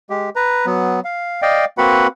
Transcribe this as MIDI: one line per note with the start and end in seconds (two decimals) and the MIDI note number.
0.10 0.30 56
0.10 0.30 67
0.36 0.66 71
0.36 0.66 82
0.66 1.00 54
0.66 1.00 59
1.05 1.42 77
1.42 1.65 74
1.42 1.65 75
1.42 1.65 77
1.42 1.65 79
1.78 2.07 58
1.78 2.07 60
1.78 2.07 66
1.78 2.07 71
1.78 2.07 78
1.78 2.07 83